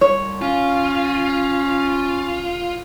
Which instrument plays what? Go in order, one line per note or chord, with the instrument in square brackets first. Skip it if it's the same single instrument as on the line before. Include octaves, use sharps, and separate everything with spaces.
[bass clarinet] C2 [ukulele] C#5
[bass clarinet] C#4 [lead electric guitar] F4